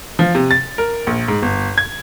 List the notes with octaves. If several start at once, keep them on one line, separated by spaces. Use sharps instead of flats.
F3
C3
A6
A#4
A#1
G#2
G1
G#6